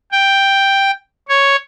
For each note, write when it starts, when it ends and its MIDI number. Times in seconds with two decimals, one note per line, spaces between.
0.12 0.91 79
1.29 1.56 73